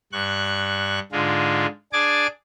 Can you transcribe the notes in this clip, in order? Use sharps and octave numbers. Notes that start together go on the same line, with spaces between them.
G2 C#6 F#6
G#2 D3 G#3 F4
D4 G#4 G#5 D6 A6